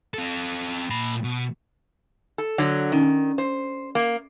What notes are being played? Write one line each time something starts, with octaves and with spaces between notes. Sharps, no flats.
C4 A4
A#2 B5
B2
A4
D3 F#3
D#3 C#4
C5
A#3